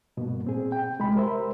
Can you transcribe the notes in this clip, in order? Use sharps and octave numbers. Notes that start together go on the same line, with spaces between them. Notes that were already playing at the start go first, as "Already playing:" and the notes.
G2 B2 A#3 B3
A#2 C4 G#4
G5
C2 G#3 G#4 B5
G4 A#4 C5 E5